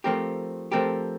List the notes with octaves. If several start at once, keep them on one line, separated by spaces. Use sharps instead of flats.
F3 A3 C4 G4 A#4
F3 A3 C4 G4 A#4